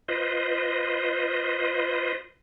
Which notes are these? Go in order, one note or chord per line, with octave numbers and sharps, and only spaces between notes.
F4 B4 C5 D#5